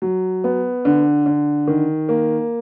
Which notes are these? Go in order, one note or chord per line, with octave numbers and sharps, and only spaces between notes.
F#3
B3
D3
D3
D#3
A#3